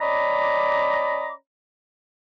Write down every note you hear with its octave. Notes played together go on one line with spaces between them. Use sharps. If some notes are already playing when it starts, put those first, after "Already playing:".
C#4 D5 D#5 A#5 B5 D6